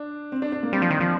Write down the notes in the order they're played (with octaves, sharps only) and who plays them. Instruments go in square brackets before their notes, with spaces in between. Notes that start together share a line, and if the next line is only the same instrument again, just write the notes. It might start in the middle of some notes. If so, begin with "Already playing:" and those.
Already playing: [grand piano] D4
C4
D4
D4
A#3
[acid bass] G3 [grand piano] C4
[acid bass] F3
D#3
F3